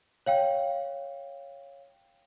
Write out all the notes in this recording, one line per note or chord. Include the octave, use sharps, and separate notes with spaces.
C#5 F5 G5